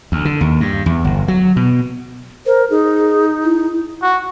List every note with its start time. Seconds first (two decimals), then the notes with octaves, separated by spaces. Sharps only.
0.12 D2
0.25 D3
0.41 D#2
0.61 G2
0.86 E2
1.04 G1
1.28 F#3
1.56 B2
2.46 A#4 C5
2.70 D#4 G#4
3.44 E4
4.02 F#4